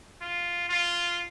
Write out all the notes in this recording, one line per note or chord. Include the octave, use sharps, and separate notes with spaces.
F4
F4